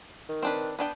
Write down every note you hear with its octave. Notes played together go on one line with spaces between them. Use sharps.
D#3
C4 D4 B4
B3 D4 G5